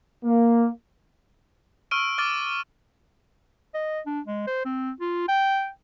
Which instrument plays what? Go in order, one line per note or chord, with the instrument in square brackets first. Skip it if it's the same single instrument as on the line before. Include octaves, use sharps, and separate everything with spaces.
[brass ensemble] A#3
[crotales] C#6 E6 F6 D7 D#7
D6 F6 A6 D#7
[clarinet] D#5
D4
G#3
C5
C4
F4
G5